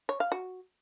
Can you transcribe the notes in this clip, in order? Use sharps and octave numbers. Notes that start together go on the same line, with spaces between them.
C#5
F5
F#4